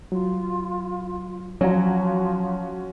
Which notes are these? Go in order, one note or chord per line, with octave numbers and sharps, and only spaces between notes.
F#3 F4
F3 F#3 C#4 F#4 G#5 A#5